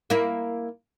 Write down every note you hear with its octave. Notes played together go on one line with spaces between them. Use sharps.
A#3 E4